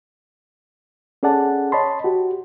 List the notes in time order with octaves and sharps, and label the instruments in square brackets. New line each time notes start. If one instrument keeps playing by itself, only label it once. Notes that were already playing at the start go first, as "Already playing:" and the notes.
[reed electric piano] C#4 G#4 A4 D5 F#5 A5
C#5 D#5 A5 B5 C6
F#4 G4